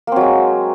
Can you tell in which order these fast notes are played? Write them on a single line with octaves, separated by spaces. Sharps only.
A#3 C4 F#3 G#3